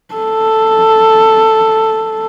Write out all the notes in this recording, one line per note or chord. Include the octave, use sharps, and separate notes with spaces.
A4